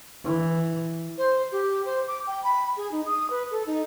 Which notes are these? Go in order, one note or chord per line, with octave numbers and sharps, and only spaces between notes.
E3
C5
G4
C5
D6
G5
B5
G#4
D#4
D#6
B4
A4
D#4